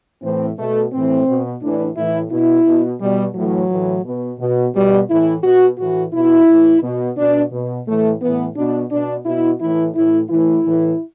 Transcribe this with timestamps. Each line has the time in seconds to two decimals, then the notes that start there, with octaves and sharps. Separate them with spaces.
0.23 A2 E3 C4
0.58 B2 A3
0.93 A2 E3 C4
1.27 B2
1.61 A2 E3 D4
1.96 A2 E3 E4
2.31 B2 E4
2.66 B2
3.01 B2 G3
3.35 A2 E3 F#3
3.70 A2 E3
4.06 B2
4.39 B2
4.75 B2 G3
5.09 A2 E3 E4
5.43 B2 F#4
5.78 A2 E3 F#4
6.13 B2 E4
6.49 A2 E3
6.83 B2
7.17 B2 D4
7.52 B2
7.87 A2 E3 A3
8.21 A2 E3 B3
8.56 B2 D4
8.91 B2 D4
9.26 B2 E4
9.61 A2 E3 E4
9.95 A2 E3 E4
10.30 A2 E3 E4
10.64 A2 E3